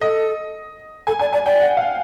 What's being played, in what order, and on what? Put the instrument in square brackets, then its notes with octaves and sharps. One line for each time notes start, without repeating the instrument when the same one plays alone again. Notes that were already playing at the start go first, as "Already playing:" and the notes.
[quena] A4 [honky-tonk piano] D#5
[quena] A4 [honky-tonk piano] G#5
[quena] D5 [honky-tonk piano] G#5
[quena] D5 [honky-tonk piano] G#5
[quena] D5 [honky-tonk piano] G5
[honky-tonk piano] F#5
F5